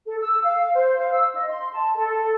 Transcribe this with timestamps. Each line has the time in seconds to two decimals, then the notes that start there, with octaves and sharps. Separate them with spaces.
0.06 A4
0.20 E6
0.44 F5
0.74 C5
0.98 F5
1.12 E6
1.34 D#5
1.48 C6
1.73 A5
1.96 A4